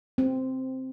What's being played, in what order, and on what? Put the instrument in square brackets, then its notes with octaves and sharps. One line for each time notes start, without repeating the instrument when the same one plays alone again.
[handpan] C4